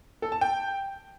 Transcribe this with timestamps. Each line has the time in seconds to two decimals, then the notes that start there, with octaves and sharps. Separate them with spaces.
0.22 A4
0.32 A5
0.41 G5